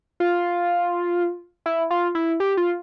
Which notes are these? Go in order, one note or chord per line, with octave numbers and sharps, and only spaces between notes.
F4
E4
F4
E4
G4
F4